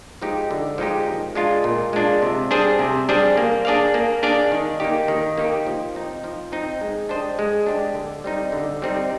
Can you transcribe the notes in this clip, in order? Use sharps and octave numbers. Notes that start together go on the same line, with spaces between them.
F3 G#3 D#4 G4
D3
F3 G#3 D#4 G4
A#2
G#3 D4 F4
A#2
G#3 D4 F4
C3
G3 D4 G#4 C5
C3
G3 D4 G#4 C5
A#3
D4 G#4 D5 F5
A#3
D4 G#4 D5 F5
D#3
A#3 D#4 G4
D#3
A#3 D#4 G4
F3
C4 D#4
F3
C4 D#4
G#3
D4 G4 C5 D#5
G#3
D4 G4 C5 D#5
D3
G3 C4 D#4
D3
G3 C4 D#4